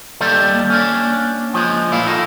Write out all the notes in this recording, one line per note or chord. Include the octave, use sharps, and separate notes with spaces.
D#2 G3 A4
A#3
C#4 D4
F3 G#3
A#2 E4 F5
D#3 D#4 A4